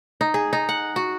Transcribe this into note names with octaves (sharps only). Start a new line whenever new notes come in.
D#4
G#4
D#4
F#5
F#4